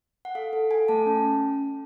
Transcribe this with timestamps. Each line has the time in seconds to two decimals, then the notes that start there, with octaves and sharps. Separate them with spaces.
0.25 F#5
0.35 A4 F5
0.53 A4
0.71 A4 G#5
0.88 A3 A5
1.06 C#4